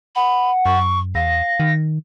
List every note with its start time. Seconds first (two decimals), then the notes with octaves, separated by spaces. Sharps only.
0.16 F#5 B5
0.66 F#2 C#6
1.15 E2 F5 A#6
1.60 D#3